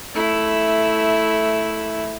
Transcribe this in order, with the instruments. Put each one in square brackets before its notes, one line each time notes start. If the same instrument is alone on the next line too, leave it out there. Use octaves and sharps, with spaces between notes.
[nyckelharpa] A3 E4